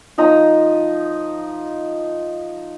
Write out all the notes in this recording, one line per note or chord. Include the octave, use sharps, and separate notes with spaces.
F3 D#4 A#5